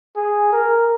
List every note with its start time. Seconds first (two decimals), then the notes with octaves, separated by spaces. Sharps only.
0.16 G#4
0.52 A#4